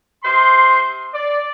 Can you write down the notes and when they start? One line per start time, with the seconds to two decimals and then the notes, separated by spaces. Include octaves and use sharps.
0.24 C3 C5 C6
1.14 D5